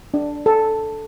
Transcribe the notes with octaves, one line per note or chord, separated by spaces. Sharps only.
D4
A4